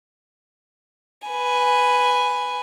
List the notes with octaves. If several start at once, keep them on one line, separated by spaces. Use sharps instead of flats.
B4 G#5